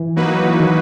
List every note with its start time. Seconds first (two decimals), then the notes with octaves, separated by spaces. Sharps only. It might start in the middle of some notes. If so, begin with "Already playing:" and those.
Already playing: E3
0.16 F#3 A#3 D#4 F#4 B4
0.45 E3
0.59 D#3